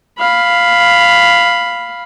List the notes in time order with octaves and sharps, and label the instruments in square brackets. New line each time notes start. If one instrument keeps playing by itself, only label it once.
[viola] F5 B5